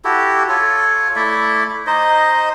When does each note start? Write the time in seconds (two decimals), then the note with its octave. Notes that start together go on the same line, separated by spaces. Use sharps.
0.05 E4 F#4 G4 A4
0.49 F4 A4 C#5
1.16 A3 E4 D5 E5
1.87 D#4 C5 D#5